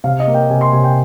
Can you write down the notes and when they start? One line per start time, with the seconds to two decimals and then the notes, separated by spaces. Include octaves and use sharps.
0.04 C3 F5
0.20 D#5
0.27 A#3
0.34 G5
0.50 C3 G#5
0.61 C6
0.72 C3 G#5
0.84 G5